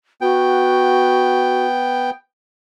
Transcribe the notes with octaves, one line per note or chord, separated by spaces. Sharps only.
B3 F#4 G5